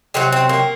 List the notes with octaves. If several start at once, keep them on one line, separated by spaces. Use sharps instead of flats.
C3 F#3 C4
C4
A#3